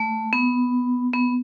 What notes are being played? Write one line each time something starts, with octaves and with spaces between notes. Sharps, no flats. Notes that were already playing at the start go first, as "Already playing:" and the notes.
Already playing: A3
B3
B3